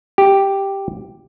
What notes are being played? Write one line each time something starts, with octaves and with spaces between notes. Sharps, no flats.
G4